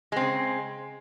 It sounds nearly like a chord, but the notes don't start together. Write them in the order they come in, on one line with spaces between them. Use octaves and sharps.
G#3 C4 C#3